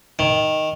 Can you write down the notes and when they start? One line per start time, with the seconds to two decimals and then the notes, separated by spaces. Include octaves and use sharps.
0.19 D#3